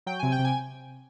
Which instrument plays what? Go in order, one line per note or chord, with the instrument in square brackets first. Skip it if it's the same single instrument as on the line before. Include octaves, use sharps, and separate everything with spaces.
[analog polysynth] F#3 G5
C3 G#5
G5
C3
G#5